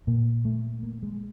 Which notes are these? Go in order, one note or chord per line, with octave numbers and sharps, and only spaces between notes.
A#2 A#3
A3
A#3
G#3